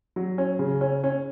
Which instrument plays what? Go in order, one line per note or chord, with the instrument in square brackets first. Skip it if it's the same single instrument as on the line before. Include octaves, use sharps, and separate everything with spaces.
[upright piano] F#3
C#4
C#3
C#4
C#4